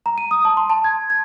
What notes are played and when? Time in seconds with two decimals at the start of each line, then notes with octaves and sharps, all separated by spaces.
0.06 A#5
0.18 D#7
0.31 D#6
0.45 A5
0.57 C6
0.70 A5
0.84 G#6
1.10 G#6